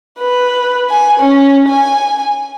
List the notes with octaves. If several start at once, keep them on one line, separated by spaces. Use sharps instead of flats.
B4
G#5
C#4
G#5